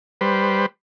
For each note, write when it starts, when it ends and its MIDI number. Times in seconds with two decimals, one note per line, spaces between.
0.21 0.66 55
0.21 0.66 71
0.21 0.66 72